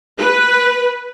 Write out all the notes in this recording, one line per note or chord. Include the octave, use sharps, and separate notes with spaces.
B4